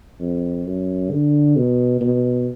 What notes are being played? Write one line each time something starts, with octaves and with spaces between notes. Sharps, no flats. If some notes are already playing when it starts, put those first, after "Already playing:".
F2
F#2
D3
B2
B2